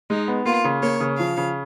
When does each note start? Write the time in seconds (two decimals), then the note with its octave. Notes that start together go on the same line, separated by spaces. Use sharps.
0.10 G#3 D#4
0.28 B3
0.45 A#3 F4
0.64 C#3
0.82 A#3 C#5
1.00 C#3
1.19 F3 F5
1.37 C#3